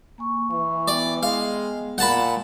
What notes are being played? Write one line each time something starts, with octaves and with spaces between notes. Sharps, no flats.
A#3 G#5 C#6
E3 C#6
B3 D5 G5
G#3 F5
A#2 F#5 A5 B5